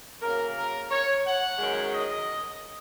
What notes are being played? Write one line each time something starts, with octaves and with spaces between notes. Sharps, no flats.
C#3 F#3 A#3 A#4
A#4
C#5
F#5
F#2 D#3 G#3 C#4
D#5